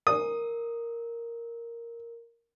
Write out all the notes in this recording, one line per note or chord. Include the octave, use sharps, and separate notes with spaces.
A#4 D#6